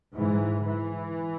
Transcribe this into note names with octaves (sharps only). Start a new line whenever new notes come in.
G#2 E3
E3